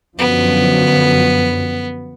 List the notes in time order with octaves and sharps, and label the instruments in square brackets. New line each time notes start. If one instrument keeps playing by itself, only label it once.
[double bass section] F#2 D3 F3 [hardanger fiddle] B3